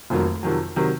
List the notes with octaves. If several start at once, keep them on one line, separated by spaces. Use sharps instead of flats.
F1 F2 D#3 F#3 A#3
F2 C3 D#3 F#3
C3 D#3 F#3